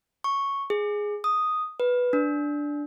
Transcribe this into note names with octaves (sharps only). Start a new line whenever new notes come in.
C#6
G#4
D#6
B4
D4